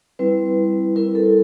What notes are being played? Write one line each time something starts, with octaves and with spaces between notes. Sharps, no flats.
G3 C4 E4 B4
G3 C4 E4 A#4
A4